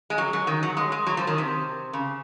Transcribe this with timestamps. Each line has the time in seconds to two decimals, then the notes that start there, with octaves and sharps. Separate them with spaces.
0.10 G#3
0.18 F#3
0.33 F#3
0.47 D#3
0.63 F#3
0.77 G#3
0.92 G#3
1.06 F#3
1.17 F3
1.27 D#3
1.38 C3
1.93 C#3